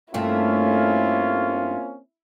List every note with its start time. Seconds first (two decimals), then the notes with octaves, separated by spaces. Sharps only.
0.14 G2 A3 A#3 C4 C#4 E4 F4